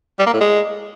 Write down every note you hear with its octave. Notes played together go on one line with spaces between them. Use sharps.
G3
A#3
A2
G#3